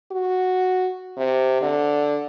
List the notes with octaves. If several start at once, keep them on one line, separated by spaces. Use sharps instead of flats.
F#4
C3
D3